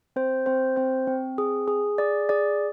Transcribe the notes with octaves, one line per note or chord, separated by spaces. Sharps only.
C4 C5
C4 C5
C4 C5
C4
G#4
G#4
G#4 D5
G#4 D5